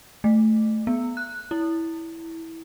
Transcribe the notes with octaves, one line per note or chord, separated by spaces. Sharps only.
A3
B3
F#6
E4